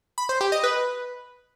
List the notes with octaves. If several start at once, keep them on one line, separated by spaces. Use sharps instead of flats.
B5
C5
G4
D#5
B4